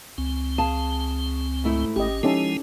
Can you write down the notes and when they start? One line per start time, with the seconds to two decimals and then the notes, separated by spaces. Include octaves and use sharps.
0.18 C#2 C4
0.58 G#4 F5 A5
1.64 G#2 A3 E4
1.96 G#1 C#4 G4 D#5
2.23 F3 G#3 C#4 D#4 E4 G4 A4